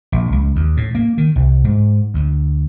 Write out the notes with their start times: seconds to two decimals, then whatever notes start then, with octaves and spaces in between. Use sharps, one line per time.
0.12 A#1
0.32 C#2
0.56 D#2
0.77 A2
0.95 A#3
1.18 D#3
1.36 C2
1.64 G#2
2.14 D2